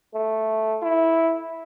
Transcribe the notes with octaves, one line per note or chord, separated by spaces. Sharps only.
A3
E4